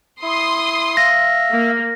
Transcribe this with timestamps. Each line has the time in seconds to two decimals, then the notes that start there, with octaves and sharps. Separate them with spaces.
0.23 E4 C6 D#6
0.97 E5 F5 A#6
1.52 A#3